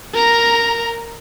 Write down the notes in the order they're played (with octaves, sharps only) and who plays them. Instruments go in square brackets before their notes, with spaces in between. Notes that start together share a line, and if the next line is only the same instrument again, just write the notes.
[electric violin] A#4 A#5